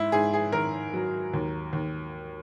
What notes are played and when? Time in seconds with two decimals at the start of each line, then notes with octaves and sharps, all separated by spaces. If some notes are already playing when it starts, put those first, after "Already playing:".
Already playing: G#2 E4
0.12 G#2 G#4
0.34 G#4
0.52 D#3 A#4
0.94 F#3
1.33 D#2
1.73 D#2